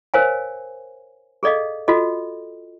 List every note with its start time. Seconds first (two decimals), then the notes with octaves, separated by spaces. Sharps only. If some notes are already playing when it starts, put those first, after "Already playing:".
0.14 A#4 C5 C#5 F5 G#5
1.43 G#4 A4 D5 D#5 F5
1.88 F4 F#4 A4 D#5